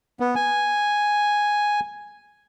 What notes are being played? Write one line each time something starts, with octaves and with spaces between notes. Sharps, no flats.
B3
G#5